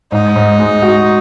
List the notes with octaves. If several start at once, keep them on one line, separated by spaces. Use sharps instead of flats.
G#2 D#4
G#2
G#3
F#4